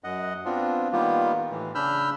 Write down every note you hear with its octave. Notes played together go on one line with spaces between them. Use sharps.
F#2 D#5 F#5
B3 C4 D4 F4
D#3 G3 A#3 B3 F4 G4
A2 E3
C#3 D4 B5 E6 F6 G6